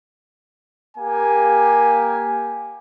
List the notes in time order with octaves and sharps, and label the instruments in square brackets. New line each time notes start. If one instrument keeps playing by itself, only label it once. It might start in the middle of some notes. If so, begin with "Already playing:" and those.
[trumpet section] A#3 G4 G#5